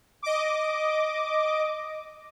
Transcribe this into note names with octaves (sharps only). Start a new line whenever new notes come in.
D#5 D6